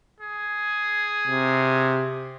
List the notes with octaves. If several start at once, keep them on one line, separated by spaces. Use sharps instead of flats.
G#4
C3